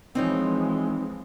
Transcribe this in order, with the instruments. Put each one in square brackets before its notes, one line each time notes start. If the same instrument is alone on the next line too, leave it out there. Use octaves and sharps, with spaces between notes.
[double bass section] E3 F3 G#3 [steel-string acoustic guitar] C4 D#4 C#5